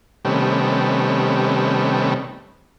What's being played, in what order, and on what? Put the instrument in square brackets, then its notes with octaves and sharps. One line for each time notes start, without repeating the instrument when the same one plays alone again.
[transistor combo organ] C3 D#3 G3 A3 B3 C#4